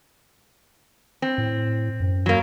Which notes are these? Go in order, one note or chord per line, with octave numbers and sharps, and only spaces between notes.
C4
A2
F#2
F#3 A#3